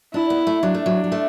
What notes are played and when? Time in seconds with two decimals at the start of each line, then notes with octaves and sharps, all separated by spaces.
0.14 D4 E4
0.30 B3
0.47 A3
0.63 F#3 D4
0.74 A3
0.86 F#3
1.04 F#3
1.12 A3